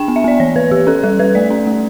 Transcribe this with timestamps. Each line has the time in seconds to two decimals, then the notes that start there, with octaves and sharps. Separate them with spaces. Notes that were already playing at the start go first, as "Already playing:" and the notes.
Already playing: D4 G5
0.08 B3
0.16 E5
0.24 B3 D5
0.40 E3 C#5
0.56 E3 B4
0.71 E3 G4
0.87 C#4 A4
1.03 G3 A4
1.19 G3 B4
1.35 A3 D5
1.51 C#4
1.67 A3